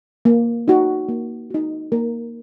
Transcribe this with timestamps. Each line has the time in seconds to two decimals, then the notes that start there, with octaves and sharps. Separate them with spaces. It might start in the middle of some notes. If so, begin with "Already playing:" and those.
0.25 A#3
0.68 D#4 F#4
1.09 A#3
1.50 D#4 F#4
1.92 A#3 A#4